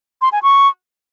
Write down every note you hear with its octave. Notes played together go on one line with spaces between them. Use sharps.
C6
G#5
C#6